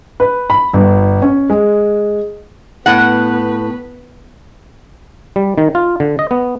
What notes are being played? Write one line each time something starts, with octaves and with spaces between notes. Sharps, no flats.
B4
B5
G1
C#4
G#3
A2 B3 B4 F#5
G3
D#3
F4
D3
D#5
B3